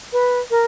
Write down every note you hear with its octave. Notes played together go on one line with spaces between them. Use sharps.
B4
A#4